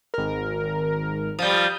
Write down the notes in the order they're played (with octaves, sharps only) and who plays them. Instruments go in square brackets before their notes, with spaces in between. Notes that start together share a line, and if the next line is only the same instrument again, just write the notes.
[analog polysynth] G#1 A#4
[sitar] F3 G3 [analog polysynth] D#6 G6